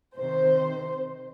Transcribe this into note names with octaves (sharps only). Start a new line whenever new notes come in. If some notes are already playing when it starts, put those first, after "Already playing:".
C3 D#3 C5